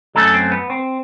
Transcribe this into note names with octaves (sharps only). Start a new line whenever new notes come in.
F#2 F#3 A3 A4
C4
B3
C4